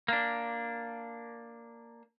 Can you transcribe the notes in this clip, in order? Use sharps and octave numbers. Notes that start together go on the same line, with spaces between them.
A#3 D4